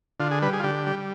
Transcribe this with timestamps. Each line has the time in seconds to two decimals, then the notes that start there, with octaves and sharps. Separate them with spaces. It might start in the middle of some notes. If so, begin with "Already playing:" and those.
0.20 D3 F4
0.31 G#4
0.42 G3 B4
0.53 G#4
0.60 F4
0.64 D3 G4
0.86 G3